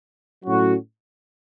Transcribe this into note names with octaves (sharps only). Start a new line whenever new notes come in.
A2 F#3 C#4 F#4